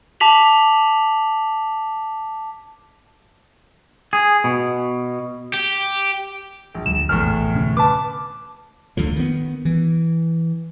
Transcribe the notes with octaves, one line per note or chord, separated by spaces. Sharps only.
A5 D6 B6 F7 F#7
G#4
B2
G4
A#1
D2 F3 G3 E7
F1 A#1 E2 A2 F6
D2 C3 C#4
B4 A5 D6
D2 D3 F3
D#3 B3
E3